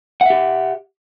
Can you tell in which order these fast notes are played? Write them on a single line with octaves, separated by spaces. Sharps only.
F#5 E5 G4